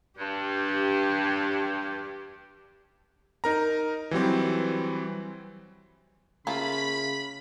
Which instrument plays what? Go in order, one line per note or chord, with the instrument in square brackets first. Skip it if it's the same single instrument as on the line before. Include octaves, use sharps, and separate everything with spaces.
[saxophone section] G2 [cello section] G4
[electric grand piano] D#4 A#4 A#5
E3 F#3 G3 C4
[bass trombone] C#3 [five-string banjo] A3 A#3 F4 [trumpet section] B5